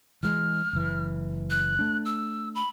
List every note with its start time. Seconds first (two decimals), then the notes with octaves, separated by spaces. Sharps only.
0.23 E3 G#3 F6
0.73 F#1 E3
1.50 F#6
1.79 A3 D4
2.05 E6
2.55 B5